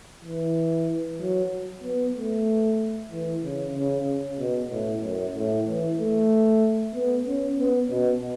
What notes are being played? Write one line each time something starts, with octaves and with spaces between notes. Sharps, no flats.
E3
F#3
B3
A3
E3
C#3
C#3
C#3
B2
A2
F#2
A2
E3
A3
B3
C#4
B3
B2